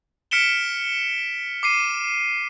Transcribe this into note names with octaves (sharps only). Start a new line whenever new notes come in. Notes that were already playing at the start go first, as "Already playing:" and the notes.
F6 B6 C#7 D7 E7 G7
D6 C7 D#7